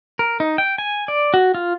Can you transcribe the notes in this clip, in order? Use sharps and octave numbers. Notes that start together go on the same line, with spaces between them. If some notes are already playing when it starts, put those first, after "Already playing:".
A#4
D#4
G5
G#5
D5
F#4
F4